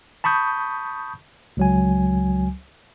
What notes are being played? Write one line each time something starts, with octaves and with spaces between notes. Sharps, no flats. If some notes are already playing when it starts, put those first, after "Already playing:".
A5 B5 C#6 D#6 G6
C#2 F#3 G#5